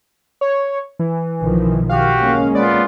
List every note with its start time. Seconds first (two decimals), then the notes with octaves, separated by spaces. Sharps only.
0.41 C#5
0.99 E3
1.42 B1 D#3 F3
1.89 F#4 G4 F5
2.21 G#3 A#3 C#4
2.55 B3 F4 D5